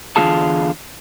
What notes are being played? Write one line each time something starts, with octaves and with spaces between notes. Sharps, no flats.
E2 D3 F3 F4 G#4 A5